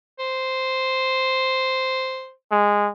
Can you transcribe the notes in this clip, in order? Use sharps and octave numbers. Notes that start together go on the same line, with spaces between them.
C5
G#3